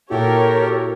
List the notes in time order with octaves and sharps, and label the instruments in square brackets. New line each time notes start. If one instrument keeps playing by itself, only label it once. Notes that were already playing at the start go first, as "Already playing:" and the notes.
[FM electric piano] A#2 E4 F#4 [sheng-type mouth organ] G4 A4 [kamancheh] A#4 C#5